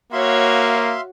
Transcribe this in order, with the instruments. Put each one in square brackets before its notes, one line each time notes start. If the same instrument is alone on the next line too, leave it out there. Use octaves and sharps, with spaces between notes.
[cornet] A#3 [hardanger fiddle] F#4 C#5 [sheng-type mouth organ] E5 F5 C6